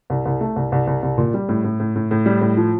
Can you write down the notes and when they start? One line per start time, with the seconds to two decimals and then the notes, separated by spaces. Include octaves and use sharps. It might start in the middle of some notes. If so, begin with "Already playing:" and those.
0.10 C2
0.25 C2
0.41 A3
0.56 C2
0.72 C2
0.87 C2
1.03 C2
1.18 A#2
1.34 G3
1.49 A2
1.64 A2
1.80 A2
1.96 A2
2.11 A2
2.26 G3
2.41 A2
2.57 F3